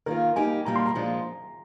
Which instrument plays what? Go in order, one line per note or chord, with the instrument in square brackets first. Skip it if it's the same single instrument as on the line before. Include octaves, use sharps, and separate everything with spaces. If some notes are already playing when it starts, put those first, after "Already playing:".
[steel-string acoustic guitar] D#3 A#3 F4 [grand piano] A#4
[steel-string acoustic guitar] G3 A#3 D#4 G4 [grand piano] G#5
[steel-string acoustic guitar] A#2 G3 A#3 [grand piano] A#5
[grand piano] C6
A#5
[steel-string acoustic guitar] A#2 F3 G#3 D4